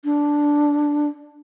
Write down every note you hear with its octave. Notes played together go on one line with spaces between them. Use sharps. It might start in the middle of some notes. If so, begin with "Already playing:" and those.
D4